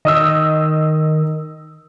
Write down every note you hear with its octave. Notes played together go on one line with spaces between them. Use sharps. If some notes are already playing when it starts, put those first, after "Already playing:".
D#3 D#5 D#6 E6